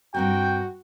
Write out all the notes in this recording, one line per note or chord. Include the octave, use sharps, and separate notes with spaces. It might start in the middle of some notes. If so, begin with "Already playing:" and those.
G2 C4 F#4 A#4 G5